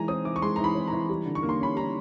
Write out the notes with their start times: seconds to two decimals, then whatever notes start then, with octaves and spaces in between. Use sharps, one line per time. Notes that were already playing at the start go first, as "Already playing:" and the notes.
Already playing: E3 G#3 G#5 A#5
0.08 C4 D#6
0.25 E3 D6
0.36 C#6
0.42 G#3 C6
0.56 E3 A#5
0.64 B5
0.75 C4
0.87 E3 A#5
1.09 G3
1.26 D3
1.35 C#6
1.43 A#3
1.49 C6
1.60 C#4 B5
1.76 G3 A#5